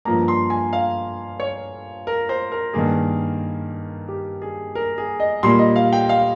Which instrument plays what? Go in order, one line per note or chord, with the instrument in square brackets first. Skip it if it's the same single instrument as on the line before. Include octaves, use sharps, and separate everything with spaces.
[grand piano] G2 F3 A#3 A#5
C6
G#5
F5
C#5
A#4
C5
A#4
G2 D#3 A#3 G#4
G4
G#4
A#4
G#4
D#5
A#2 G3 A#3 C6
D#5
F5
G5
F5